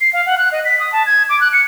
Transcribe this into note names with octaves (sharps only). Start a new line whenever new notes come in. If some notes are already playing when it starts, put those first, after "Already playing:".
C7
F5
F#5
F#6
D#5
B6
D#6
A5
G#6
D6
F#6
C#7